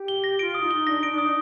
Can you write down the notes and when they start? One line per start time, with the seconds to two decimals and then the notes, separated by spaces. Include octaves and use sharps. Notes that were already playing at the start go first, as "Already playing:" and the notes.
Already playing: G4
0.08 G7
0.24 A#6
0.39 F4 D7
0.55 F4 D#6
0.62 D#4
0.71 G7
0.86 D4 A#6
0.98 D#4 D7
1.10 D4
1.18 D#4 D#6